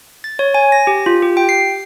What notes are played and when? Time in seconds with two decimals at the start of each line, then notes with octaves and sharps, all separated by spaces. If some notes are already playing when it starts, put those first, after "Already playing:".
0.24 A6
0.39 C#5
0.54 G#5
0.72 A#6
0.87 G4
1.06 F4
1.22 G4
1.37 G5
1.49 C7